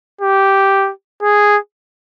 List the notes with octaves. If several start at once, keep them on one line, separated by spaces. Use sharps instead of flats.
G4
G#4